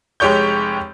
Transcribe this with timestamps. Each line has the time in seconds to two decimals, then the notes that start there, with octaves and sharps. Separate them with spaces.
0.20 F1 G#3 G4 C#5 C#6 G6